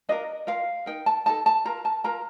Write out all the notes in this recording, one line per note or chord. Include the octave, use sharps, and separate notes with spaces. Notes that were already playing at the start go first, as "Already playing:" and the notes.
D4 F4 A#4 D#5
F4 A#4 F5
D#4 A#4 G5
A5
D#4 A4 A5
A5
F4 A#4 A#5
A5
F4 A#4 A#5